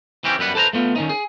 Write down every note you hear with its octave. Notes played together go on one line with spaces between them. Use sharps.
E3 C4 C#4 G4
F#2 G3 B4 F#5
A4 B4 C5 A5 A#5
A3 B3 F4
D#3 C#4 D#4
G#4